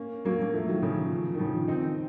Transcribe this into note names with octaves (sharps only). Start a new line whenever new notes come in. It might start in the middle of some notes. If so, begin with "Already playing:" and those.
Already playing: A#3 C#4
F#3 A#3
A#3
F3 A3
D#3 F#3
C#3 F3
D#3
C#3 F3
C4 D#4